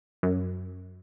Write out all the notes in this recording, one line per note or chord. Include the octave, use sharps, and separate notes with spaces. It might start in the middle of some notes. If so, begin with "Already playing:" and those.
F#2